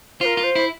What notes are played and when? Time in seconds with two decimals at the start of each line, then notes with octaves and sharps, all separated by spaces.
0.20 F4 A#4 C5
0.37 F4
0.43 C5
0.55 E4